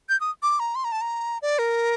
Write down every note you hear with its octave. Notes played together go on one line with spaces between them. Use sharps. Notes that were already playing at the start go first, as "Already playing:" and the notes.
G6
D#6
D6
A#5
C6
A#5
A5
A#5
D5
A#4